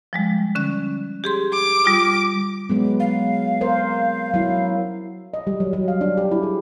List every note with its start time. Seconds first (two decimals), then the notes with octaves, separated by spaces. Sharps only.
0.13 F3 G3 G#3
0.55 D3 C#4 F#6
1.24 G4 G#4 C6
1.53 D6
1.84 G3 F4 D#6
2.70 F#3 G#3 B3
3.00 F5
3.61 A#4 C5
4.34 F#3 E4
5.34 D#5
5.47 G3
5.60 F#3
5.73 F#3
5.88 F5
6.01 D4
6.18 G4
6.31 E4
6.43 G#4